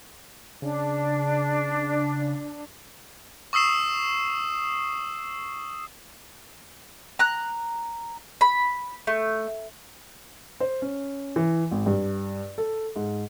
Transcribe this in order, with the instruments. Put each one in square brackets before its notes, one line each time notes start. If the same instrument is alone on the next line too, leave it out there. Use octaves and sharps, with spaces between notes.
[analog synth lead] C#3 [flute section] D4
[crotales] C#6 D#6 E6 C7 E7
[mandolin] A#5 F#6
B5
A3
[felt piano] C5
C#4
E3
G#1
G2
A4
G#2